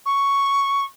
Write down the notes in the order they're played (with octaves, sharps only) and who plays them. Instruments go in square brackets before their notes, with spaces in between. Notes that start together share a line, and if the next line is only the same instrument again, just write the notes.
[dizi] C#6